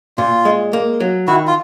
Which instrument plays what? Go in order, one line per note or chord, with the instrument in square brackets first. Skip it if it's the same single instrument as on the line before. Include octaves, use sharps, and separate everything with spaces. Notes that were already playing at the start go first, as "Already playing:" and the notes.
[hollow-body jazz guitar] A#2 [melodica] F4
[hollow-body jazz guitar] G#3
A#3
F#3
[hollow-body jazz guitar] D#3 [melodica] E4 F#4
[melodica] F4